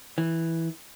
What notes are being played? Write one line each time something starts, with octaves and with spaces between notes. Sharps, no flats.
E3